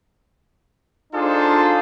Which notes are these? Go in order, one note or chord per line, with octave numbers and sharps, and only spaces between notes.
D4 D#4 F4 G#4 A4 C5